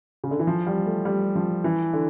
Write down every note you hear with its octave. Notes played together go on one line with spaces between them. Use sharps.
C#3
D3
E3
F3
G3
A3
G3
F3
E3
D3